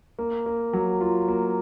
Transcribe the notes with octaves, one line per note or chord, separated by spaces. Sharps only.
A#3
A#3
F#3
F4
A#3